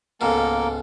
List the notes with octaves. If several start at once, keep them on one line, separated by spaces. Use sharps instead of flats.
C#2 G#2 B2 A#3 A4 A#4